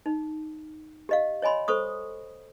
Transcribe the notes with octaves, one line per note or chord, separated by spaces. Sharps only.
D#4
G4 D#5 F5
C#5 D#5 G#5 B5 C6
A4 C5 C#6 D#6